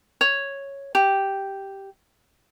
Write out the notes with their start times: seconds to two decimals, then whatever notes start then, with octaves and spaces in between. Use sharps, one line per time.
0.21 C#5
0.95 G4